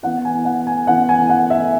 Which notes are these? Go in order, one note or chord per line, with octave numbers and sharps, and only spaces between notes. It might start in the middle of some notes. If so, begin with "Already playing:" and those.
E3 B3 F#5
G#5
F#5
G#5
E3 B3 F#5
G#5
F#5
E5